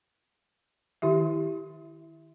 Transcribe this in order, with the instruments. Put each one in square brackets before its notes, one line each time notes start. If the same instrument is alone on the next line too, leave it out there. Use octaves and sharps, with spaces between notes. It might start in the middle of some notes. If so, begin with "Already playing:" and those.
[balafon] D#3 E4 G4 E5